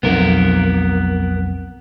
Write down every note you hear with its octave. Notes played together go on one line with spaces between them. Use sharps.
B1 F2 B3 A#4